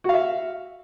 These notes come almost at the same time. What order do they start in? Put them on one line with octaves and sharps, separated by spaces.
F#4 F5 E5